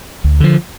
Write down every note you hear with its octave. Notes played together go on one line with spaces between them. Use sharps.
D2
D3 F3